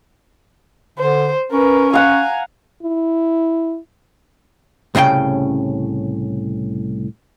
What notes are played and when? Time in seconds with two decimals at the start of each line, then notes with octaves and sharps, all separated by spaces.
0.98 D3 C5
1.52 C#4 A#4 B4
1.94 F5 F#5 G#5 A#5
2.83 E4
4.95 C2 A2 C#3 C#4 G5